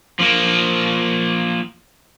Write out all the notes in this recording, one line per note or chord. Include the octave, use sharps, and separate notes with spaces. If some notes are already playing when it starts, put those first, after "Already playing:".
F3 A#3